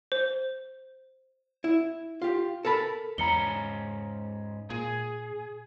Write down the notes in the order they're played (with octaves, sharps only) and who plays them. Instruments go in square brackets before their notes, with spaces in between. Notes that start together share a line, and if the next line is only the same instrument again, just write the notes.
[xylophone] C5
[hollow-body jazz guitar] E4
F4 G4
A4 A#4 A5 B5
[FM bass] E2 [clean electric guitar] G#2 C#4 B5 [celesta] A#5 C#7 G7
[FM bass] A#2 [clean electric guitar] G#4